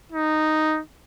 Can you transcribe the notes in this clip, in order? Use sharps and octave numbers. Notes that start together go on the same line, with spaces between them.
D#4